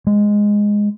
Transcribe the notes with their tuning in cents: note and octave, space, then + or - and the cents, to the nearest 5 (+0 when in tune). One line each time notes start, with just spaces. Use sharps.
G#3 -5